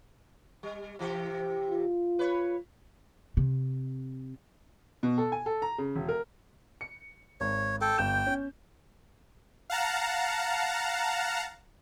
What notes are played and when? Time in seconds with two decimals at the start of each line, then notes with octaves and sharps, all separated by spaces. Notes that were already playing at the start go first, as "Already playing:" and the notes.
0.63 G3
0.99 C3 E3 G4
1.70 F4
2.19 B4 C#5
3.37 C3
5.03 B2
5.18 A4
5.32 G#5
5.46 A4
5.62 A#5
5.78 C#3
5.95 E1
6.09 A#4
6.81 C#7
7.41 G#1 C#5
7.81 A4 G5
7.98 G1 G5 G6 E7
8.26 C#4
9.70 F5 F#5 A5 A#5